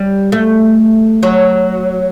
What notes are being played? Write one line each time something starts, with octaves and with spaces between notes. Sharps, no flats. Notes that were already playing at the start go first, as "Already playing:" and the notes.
Already playing: G3
A3
F#3